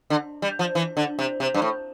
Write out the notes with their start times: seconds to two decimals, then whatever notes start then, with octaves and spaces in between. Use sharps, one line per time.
0.10 D3
0.42 G3
0.59 F3
0.75 E3
0.97 D3
1.19 C3
1.40 C3
1.54 G2
1.62 A2